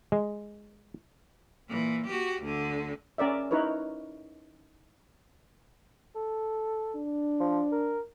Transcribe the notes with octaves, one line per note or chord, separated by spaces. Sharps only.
G#3
A#2 E3
F#4 G4
D2 D3
C#4 A#4 D5 E5
D#4 E4 A#4 B4 C#5
A4
D4
F3
A#4